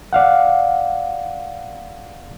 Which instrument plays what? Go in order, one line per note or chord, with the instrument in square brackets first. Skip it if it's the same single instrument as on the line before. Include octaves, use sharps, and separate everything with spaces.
[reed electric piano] D5 F5 F#5